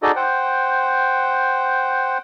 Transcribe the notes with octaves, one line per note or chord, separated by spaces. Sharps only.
D#4 F#4 G#4 A4 D5 D#5
C5 F#5 G5